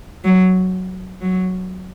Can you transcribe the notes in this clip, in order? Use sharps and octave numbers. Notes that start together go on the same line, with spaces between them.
F#3
F#3